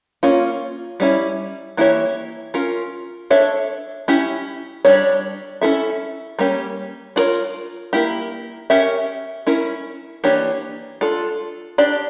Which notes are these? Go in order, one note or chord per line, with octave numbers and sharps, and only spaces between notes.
A#3 C#4 F4
G3 C#4 E4
E3 A#3 E4 G4 C#5
C#4 F4 A#4
D4 A4 C#5 E5
C#4 E4 G4
G3 D4 G4 C#5
C#4 E4 A4 E5
G3 A#3 C#4 G4
D4 F4 A#4 C#5
A#3 E4 G4
C#4 G4 A#4 E5
C#4 E4 A#4
E3 A#3 D4 G4 C#5
D4 F4 A4
D4 G4 D5